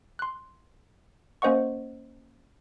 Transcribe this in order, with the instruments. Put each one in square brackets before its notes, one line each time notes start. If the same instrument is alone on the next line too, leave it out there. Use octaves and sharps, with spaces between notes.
[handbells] C6 F#6
A#3 C#4 C5 D#5 F#5 C#6